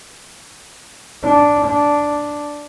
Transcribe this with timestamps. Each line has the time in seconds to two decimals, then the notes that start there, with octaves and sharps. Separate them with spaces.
1.23 D4
1.66 D4